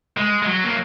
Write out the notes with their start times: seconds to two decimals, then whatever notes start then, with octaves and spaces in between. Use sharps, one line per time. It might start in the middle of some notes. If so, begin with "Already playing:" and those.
0.18 G#3
0.42 G#3
0.46 F#3
0.64 A#3